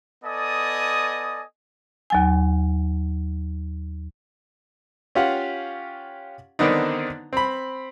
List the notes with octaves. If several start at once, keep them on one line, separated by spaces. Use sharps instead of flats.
B3 A4 D5 D#5 G#5 D#6
D#2 F#3 G#5
C#4 F4 G4 F5 F#5
D3 D#3 B3 C4 D4 D#4
C4 B5